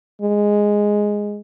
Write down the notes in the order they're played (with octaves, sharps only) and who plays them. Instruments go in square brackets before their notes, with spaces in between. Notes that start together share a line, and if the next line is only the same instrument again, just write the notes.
[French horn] G#3